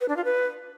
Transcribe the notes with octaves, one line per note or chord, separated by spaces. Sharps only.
B4
D4
F4
B4